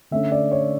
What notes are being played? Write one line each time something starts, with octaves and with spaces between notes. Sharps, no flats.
D3 A3 C#4 E5
D5
C#5